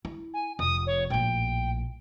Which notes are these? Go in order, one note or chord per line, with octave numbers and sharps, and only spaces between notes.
E4
G#5
F1 D#6
C#5
A#1 A2 G5